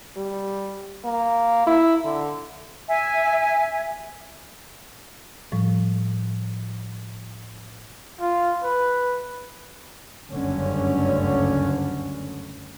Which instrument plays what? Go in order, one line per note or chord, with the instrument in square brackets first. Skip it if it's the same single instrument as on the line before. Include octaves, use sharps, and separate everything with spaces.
[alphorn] G3
A#3
E4
D3
[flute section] E5 G#5
[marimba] A2 F3 G3
[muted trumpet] F4
B4
[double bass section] F#1 D2 G2 D3 C#4